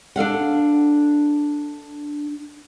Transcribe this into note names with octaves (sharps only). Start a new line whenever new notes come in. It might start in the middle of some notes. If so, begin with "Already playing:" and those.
D4 A4 F5 F#5